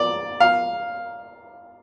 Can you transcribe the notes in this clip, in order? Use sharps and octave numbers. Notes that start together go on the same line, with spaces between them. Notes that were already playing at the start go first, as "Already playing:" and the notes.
Already playing: D5
F5